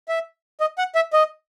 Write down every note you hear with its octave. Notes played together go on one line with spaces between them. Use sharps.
E5
D#5
F#5
E5
D#5